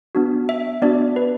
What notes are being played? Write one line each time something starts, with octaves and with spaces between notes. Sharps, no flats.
B3 D4 F#4
E5
B3 D4 F#4 D5
B4